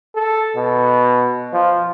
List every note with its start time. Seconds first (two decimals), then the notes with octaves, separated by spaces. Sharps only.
0.15 A4
0.56 B2
1.53 F3